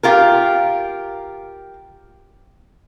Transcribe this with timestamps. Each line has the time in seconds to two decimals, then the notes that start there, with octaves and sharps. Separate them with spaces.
0.03 F4 G4 A#4